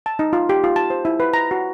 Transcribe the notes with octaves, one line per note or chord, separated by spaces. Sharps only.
A5
D#4
F4
G4
F4
A5
C5
E4
B4
A#5
F#4